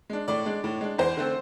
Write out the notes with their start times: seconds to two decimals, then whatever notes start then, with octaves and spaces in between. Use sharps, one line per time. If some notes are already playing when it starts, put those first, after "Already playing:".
0.10 G#3 D4
0.28 A2 D5
0.45 G#3 D4
0.64 A2
0.81 G#3 D4
0.98 E2 C5
1.17 D3 A3 C4